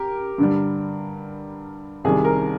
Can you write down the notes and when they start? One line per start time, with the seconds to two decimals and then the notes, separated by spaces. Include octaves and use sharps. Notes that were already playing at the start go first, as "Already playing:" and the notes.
Already playing: G4 A#4
0.38 G2 D3 G3
2.04 C2 C3 D#3 G3 G#4
2.24 A#4